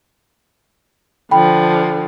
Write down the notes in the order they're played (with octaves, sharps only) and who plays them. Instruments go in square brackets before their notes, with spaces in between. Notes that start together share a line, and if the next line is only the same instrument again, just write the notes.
[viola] D3 F3 [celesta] G5 B5